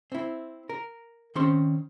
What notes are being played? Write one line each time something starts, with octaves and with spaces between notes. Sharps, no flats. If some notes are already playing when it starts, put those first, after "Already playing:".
C4 E4
A#4
D#3 C4 C#4 C5 C6